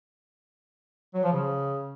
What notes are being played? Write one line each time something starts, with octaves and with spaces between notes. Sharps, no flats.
F#3
F3
C#3